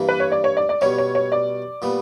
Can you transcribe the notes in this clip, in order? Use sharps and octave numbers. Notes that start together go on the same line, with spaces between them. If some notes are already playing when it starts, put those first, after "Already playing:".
Already playing: G2 E3 G3 A#3 D4
B4
C#5
D5
C#5
D5
D5
B2 G3 C#4 C#5
C#5
C#5
D5
A#2 G3 B3